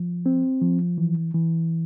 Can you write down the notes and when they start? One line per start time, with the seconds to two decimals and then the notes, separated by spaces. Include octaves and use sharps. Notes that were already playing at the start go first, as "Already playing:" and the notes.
Already playing: F3
0.26 C4
0.62 F3
0.98 E3
1.34 E3